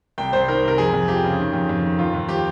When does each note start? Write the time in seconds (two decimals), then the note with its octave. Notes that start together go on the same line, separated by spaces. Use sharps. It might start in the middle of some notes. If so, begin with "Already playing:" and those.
0.18 C2 G5
0.33 C2 C5
0.48 D#3 A#4
0.64 C3 A#4
0.78 F2 G#4
0.93 F2
1.08 F3 G4
1.24 C#3
1.39 D#3
1.53 F2
1.69 F2
1.84 D#3
1.99 D#2 F4
2.13 D#2
2.29 F3 G4